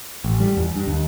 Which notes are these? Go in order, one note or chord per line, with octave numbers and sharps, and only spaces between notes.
A1
G3
E2
G2
D#2